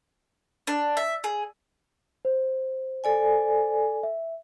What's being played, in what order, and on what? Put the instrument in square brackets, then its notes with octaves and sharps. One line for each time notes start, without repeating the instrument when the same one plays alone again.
[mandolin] D4
E5
G#4
[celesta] C5
[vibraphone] A4 D5 G#5
[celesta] E5